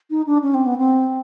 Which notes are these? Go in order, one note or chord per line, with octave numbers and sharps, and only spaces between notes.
D#4
D4
C#4
C4
B3
C4